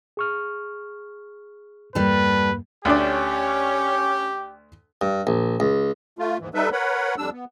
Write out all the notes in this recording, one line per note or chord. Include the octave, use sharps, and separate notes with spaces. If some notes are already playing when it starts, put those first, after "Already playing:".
G#4 C#6 F6
E2 G2 G3 A#3 A4 B4
D2 C#4 D4 G4 C#5 D5
G2
A#1
C#2
A3 F4
D#2 G#2 E3
G3 D#4 A4 B4 E5
A#4 B4 C#5 F#5 B5
F2 G3 D4 E6
B3